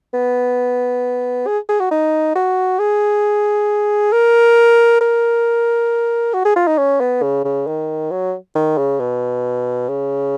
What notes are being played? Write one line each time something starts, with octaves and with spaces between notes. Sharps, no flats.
B3
G#4
G#4
F#4
D#4
F#4
G#4
A#4
A#4
F#4
G#4
F4
D#4
C#4
B3
C#3
C#3
D#3
F#3
D#3
C#3
B2
C#3